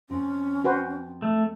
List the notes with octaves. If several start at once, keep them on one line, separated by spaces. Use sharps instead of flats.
F2 C4 C#4
F#4 B4 C5 G5
A3